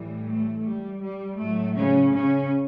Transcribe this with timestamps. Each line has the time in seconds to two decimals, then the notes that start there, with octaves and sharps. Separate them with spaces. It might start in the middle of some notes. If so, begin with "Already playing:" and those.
Already playing: A2 E3 G3
0.27 A3
0.65 G3
1.03 G3
1.40 A2 F#3 A3
1.78 C#3 C#4
2.15 C#3 C#4